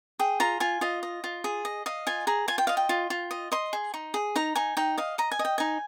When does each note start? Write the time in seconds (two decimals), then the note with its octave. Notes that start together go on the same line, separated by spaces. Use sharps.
0.19 G#4 G5
0.40 F4 A#5
0.60 F4 G#5
0.81 F4 D#5
1.03 D#5
1.24 F4
1.44 G#4
1.65 D#5
1.86 D#5 F5
2.07 F4 G#5
2.27 G#4 A#5
2.48 F4 G#5
2.58 G5
2.67 D#5 F5
2.77 G5
2.89 F4
3.10 F4
3.31 D#5
3.52 D#5 C6
3.73 G#4
3.94 D#4
4.14 G#4
4.36 D#4 A#5
4.56 D#4 G#5
4.77 D#4 G5
4.98 D#5 F5
5.18 D#5 A#5
5.32 G#5
5.39 D#5
5.45 G5
5.58 D#4 G#5